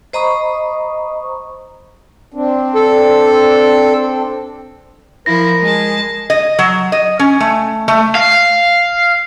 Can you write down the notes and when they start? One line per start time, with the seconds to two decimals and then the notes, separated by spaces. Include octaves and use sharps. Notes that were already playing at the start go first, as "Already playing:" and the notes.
0.13 C5 D#5 A#5 B5 C#6 D#6
2.34 C4 D4
2.75 A4
5.26 F3 E4 A#4 A#6
5.60 G#3 A5
6.30 D#5
6.59 F#3
6.92 D#5
7.19 C#4
7.40 A3
7.88 A3
8.15 F5